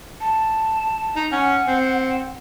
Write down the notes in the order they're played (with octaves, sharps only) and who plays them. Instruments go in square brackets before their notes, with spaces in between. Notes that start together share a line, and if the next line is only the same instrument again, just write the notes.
[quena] A5
[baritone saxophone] D#4
[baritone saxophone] C#4 [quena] F#5
[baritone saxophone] C4